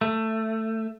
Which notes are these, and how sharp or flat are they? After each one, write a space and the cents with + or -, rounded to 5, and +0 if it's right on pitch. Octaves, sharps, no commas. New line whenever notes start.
A3 +15